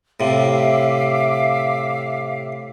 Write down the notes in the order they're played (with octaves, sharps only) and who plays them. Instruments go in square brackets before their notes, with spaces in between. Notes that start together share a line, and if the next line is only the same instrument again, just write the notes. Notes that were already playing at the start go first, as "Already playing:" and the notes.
[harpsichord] A2 C3 [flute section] E5 F5 D6